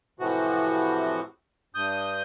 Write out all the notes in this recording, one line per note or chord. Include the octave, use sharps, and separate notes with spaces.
A2 C3 E3 F3 F#4
G2 D#6 G6